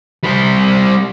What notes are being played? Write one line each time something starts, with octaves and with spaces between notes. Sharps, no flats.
G3 C5